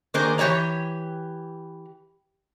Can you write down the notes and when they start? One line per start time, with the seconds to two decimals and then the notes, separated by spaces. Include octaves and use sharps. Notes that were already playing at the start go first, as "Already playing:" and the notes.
0.14 D#3 A#3 D4 G#4 A#4 C5
0.38 E3 G4 C#5 D5 A#5